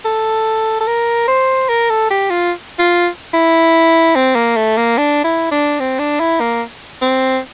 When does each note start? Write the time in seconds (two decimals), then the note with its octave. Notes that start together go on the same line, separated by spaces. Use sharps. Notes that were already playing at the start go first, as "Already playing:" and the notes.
0.05 A4
0.81 A4
0.87 A#4
1.28 C5
1.69 A#4
1.90 A4
2.10 G4
2.30 F4
2.79 F4
3.34 E4
4.16 C4
4.35 A#3
4.56 A3
4.77 A#3
4.98 D4
5.24 E4
5.52 D4
5.80 C4
5.99 D4
6.20 E4
6.40 A#3
7.02 C4